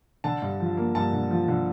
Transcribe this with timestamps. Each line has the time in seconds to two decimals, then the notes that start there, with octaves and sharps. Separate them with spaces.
0.24 D3 A5
0.42 G2
0.60 F3
0.77 A#3
0.95 G2 A5
1.13 D3
1.31 F3
1.48 D3